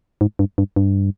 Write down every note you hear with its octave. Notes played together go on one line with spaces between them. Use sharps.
G#2
G2
G2
G2